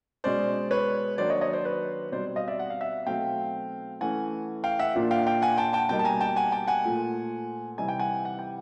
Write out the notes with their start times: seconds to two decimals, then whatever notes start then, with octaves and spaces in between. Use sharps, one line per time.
0.24 B2 G#3 C#4 C5 D5
0.71 B4 C#5
1.18 D#3 F#3 A#3 D4 C5 D5
1.30 C#5 D#5
1.41 C#5 D#5
1.53 C5 D5
1.65 B4 C#5
2.12 B2 G3 C4 D#4 C5 D5
2.36 D#5 F5
2.48 D5 E5
2.59 F#5
2.70 F5
2.81 E5 F#5
3.06 B2 F#3 A3 C4 D#4 F5 G5
4.01 E3 A3 C#4 F#5 G#5
4.64 F5 G5
4.79 E5 F#5
4.95 A#2 F3 A#3 D4
5.11 F5 G5
5.26 F5 G5
5.42 F#5 G#5
5.58 G5 A5
5.73 G5 A5
5.89 B2 G3 A#3 D#4 G5 A5
5.99 A5
6.05 G#5 A#5
6.21 G5 A5
6.36 F#5 G#5
6.52 G5 A5
6.68 F#5 G#5
6.84 A#2 F3 A3
7.78 C3 E3 G3 C4 D#4 G#5
7.89 G5
7.99 F#5 G#5
8.25 F#5
8.39 G5